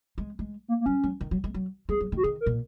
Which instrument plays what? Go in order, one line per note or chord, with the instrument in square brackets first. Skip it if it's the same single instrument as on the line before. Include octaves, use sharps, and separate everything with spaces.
[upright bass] G#3
G#3
[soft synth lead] A#3
A#3
[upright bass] F#3 [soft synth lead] C#4
[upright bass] F#3
D#3
F#3
G#3
F#3
[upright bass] G#3 [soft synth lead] G#4
[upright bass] F#3
D#3
[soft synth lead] F#4
[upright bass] D#3 [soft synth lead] G#4
[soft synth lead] A#4
[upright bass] A#2